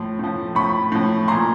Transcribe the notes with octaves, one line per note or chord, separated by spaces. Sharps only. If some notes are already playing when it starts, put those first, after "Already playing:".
Already playing: A2 F3 C6
A2 F3
A2 F3 B5 C#6
A2 F3
A#2 F3 A#5 C6